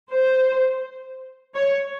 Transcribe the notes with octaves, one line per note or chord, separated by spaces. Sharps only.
C5
C#5